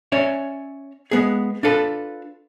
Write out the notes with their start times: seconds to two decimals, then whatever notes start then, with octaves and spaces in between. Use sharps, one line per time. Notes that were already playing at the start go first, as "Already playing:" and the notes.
0.12 C#4 C#5 D5 E5
1.11 G#3 B3 G#4
1.63 D4 F4 A4 B4